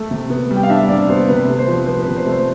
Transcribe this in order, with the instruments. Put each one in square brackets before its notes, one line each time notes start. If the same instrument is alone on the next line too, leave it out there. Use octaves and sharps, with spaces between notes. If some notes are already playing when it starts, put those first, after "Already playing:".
Already playing: [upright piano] A3
C3
B3
G3
G5
F5
D4 E5
C3 D5
B3 C5
C3 B4
A3
C5
F3
C4 B4
B4
C3
C5
A3
C5